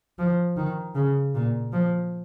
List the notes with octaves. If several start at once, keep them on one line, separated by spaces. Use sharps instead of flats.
F3
D#3
C#3
A#2
F3